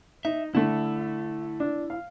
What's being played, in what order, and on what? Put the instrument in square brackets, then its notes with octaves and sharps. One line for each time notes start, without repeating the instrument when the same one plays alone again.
[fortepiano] D#4 [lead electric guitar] E5
[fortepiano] D3 A3 [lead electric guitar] E4
[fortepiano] D4
F5